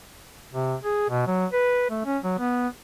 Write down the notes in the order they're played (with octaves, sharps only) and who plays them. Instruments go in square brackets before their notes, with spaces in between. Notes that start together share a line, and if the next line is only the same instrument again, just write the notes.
[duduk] C3
G#4
B2
F#3
B4
A3
C#4
F#3
B3